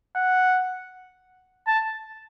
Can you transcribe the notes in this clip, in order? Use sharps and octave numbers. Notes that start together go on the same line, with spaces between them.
F#5
A5